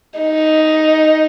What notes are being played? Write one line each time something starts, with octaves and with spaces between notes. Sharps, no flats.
D#4